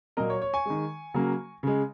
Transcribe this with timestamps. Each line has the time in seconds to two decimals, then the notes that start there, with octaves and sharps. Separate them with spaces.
0.17 A#2 F#3 A#3 A#4 D#5
0.30 C#5
0.42 C#5
0.54 G#5 C#6
0.66 D#3 G#3
1.14 C#3 F#3 A#3
1.63 C#3 G#3